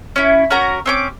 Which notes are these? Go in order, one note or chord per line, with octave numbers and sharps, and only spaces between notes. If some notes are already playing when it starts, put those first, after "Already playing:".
C#4 E4
C#4 F#4 A#4 A#5
C4 C#4 D6